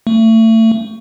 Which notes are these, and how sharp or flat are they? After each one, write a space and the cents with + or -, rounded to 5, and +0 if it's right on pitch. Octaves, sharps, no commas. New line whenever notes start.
A3 +30